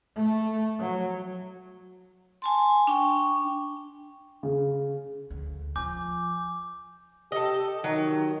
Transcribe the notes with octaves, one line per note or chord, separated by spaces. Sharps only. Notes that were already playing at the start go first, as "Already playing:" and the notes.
A3
F#3
G#5 A5 C6
D4 G5 C#6
C#3
D2
F3 F4 G#5 D6 G6
G4 A4 D#5
D#3 F#3